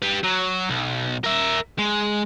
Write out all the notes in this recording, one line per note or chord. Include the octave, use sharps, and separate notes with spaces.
G4 B4
F#3
B1
A#4 E5
G#3